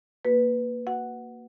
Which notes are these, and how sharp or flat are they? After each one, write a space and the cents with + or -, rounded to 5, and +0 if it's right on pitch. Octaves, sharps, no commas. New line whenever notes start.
A#3 +0 F#4 +0 B4 +0
F#4 +0 F#5 +0